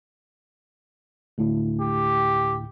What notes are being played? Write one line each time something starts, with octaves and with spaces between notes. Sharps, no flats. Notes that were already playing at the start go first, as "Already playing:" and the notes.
D2 A2
G4